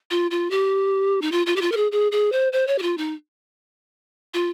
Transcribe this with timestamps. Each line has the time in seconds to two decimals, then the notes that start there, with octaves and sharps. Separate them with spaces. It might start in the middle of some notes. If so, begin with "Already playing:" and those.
0.11 F4
0.31 F4
0.51 G4
1.22 D#4
1.32 F4
1.46 F4
1.56 G4
1.62 F4
1.72 A#4
1.77 G#4
1.92 G#4
2.12 G#4
2.32 C5
2.53 C5
2.67 C#5
2.78 G4
2.82 F4
2.98 D#4
4.34 F4